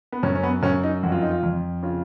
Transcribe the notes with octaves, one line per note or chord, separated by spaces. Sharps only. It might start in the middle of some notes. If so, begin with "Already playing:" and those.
B3
F#2 C#4
C#4
B3
F#2 C#4
D#4
F2 F#4
F4
D#4
F4
F2
C#3 F4